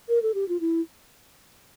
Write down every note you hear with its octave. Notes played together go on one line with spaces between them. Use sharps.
A#4
A4
G4
F4
E4